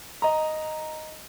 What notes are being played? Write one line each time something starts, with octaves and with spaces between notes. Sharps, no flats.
D#5 A#5